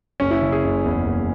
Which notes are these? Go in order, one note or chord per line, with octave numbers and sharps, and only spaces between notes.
F#1 C#4
E4
C#3
G#4
F#1
E2
F#1